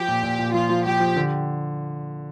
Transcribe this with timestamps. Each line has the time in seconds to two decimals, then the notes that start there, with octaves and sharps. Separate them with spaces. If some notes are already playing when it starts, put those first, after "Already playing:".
Already playing: F3 G4
0.08 A#2
0.23 A#2
0.39 A#2
0.54 F3 F4
0.69 F3
0.85 F3 G4
1.00 F3
1.16 D3